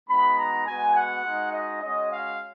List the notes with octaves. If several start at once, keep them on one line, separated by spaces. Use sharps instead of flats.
G#3 B3 D#4 F#4 B5
A#5
G#3 B3 F#4 G#5
F#5
G#3 D#4 F#4
D#5
G#3 C#4 F#4 D#5
F5